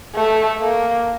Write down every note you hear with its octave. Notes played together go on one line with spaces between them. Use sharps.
A3
A#3